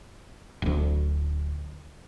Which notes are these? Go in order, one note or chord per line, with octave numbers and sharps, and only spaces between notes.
D1 D2